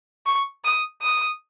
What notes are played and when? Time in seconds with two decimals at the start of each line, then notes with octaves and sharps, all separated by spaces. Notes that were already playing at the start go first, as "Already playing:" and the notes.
0.26 C#6
0.64 D#6
1.02 D#6